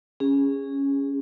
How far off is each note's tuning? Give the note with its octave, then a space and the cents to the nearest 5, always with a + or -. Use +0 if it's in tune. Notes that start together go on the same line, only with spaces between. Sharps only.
C#4 +0 G#4 -20